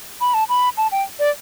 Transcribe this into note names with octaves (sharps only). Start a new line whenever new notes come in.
B5
A5
B5
A5
G5
D5